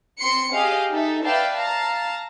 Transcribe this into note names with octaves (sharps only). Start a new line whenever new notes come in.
C4 C6 C7 C#7
G4 G#4 D#5 F5
D#4 A4 E5
B4 D5 E5 F5 G5 A5
F5 A5 A#5